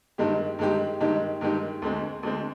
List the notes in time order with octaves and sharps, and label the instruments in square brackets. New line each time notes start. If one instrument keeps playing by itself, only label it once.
[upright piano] G2 D#3 G#3 D#4 G4
G2 D#3 G#3 D#4 G4
G2 D#3 G#3 D#4 G4
G2 D#3 G#3 D#4 G4
D2 D3 G#3 C4
D2 D3 G#3 C4